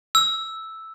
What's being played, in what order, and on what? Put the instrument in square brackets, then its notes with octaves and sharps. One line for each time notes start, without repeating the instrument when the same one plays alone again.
[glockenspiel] E6